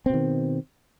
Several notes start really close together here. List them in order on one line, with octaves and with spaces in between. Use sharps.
C4 B2 D#3